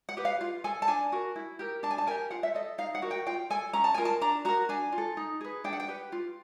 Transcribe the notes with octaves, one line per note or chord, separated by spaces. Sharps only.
F#5
G4 B4
F5
F4
A4 G#5
A5
D4 G#5
F#4 A#4
E4
G4 A#4
D4 A5
G#5
A5
G4 A#4 G#5
F4 F#5
E5
A4 D#5
D#4 F5
F#5
F#4 A#4
G5
F4 G5
A4 G#5
C#4 A#5
A5
F4 A#4 G#5
A5
D4 A#5
F#4 A#4 A#5
D4 G#5
F4
A4
D#4
G#4 B4
D4 G5
F#5
G5
G4 B4
F4